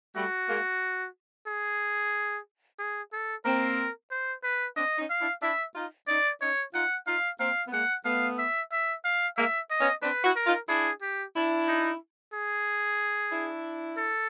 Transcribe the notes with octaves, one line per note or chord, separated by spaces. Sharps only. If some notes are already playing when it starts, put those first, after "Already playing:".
G3 A3 F#4
G#3 A#3
G#4
G#4
A4
A#3 C4 A#4
C5
B4
C4 D4 D#5
C#4 D#4
F5
D4 E4
D4 E4 E5
D#4 F4
C#4 D#4 D5
C#4 D#4 C#5
D#4 F4 F#5
D#4 F4 F5
A#3 C4 F5
B3
G#3 A#3 F#5
A3 B3 F5
E5
E5
F5
G#3 A#3 E5
D#5
B3 C#4
C4 D4 B4
E4 F#4
A#4
D#4 F4
D4 E4 G#4
G4
D4 E4
D#4
G#4
D4 E4
A4